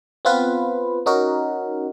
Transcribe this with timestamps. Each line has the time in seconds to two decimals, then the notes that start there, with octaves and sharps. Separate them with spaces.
0.25 B3 C4 F4 B4
1.06 C#4 D#4 F#4 A#4